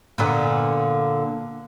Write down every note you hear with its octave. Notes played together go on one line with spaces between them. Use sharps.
A#2 D3 B3